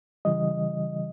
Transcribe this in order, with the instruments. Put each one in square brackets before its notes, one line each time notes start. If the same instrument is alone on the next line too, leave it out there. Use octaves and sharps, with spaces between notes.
[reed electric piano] C#3 E3 G3 D#5